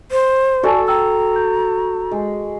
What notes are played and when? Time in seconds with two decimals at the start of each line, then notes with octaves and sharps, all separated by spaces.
0.11 C5
0.63 F#4 A4 D5 G#5 A5
0.88 G5 A#5 E6
1.36 G6
2.11 G#3